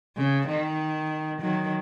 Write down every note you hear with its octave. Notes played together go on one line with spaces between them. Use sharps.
C#3
D#3
D#3 F#3